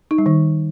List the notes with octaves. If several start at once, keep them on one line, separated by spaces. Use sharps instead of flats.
D#4
G3
D#3